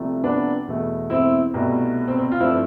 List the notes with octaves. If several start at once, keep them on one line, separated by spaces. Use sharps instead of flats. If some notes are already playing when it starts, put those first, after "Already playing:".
Already playing: C2 C3 F3 A3
B3 D4
E2 B2 A3
C4 E4
C2 B2 A3
C4
C4
F4
G2 F3 A3 C4 E4